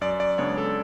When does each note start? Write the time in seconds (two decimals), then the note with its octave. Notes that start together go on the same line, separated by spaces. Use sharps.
0.01 F#2 D5
0.20 D5
0.38 C#3 G#3 B3 D4 C#5
0.58 A4